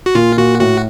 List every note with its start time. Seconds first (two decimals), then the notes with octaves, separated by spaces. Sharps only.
0.06 F#4
0.15 A#2 F4
0.37 A#2 F#4
0.60 A2 F#4